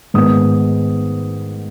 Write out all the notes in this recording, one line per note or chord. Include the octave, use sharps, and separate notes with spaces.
G#2 D#3 G#3 B3 D#6